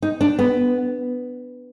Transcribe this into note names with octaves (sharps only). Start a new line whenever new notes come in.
D#4
D4
B3